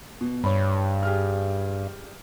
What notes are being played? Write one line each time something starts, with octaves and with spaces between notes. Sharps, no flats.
B2
G2 C#5 B5
G4 G#4 F6